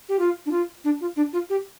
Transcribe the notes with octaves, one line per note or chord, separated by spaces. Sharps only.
G4
F4
D4
F4
D4
F4
D4
F4
G4